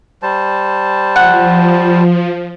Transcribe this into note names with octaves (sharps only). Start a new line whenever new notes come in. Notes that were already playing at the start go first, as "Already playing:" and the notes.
G3 C5 A5
F3 F#5